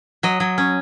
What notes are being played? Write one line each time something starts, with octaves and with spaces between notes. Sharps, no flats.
F#3 D#5
F#3
C#4